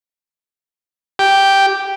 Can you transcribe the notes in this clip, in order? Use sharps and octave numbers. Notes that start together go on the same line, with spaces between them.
G4